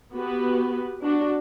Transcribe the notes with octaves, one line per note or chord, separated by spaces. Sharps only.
B3 F#4 G4 B4
D4 F#4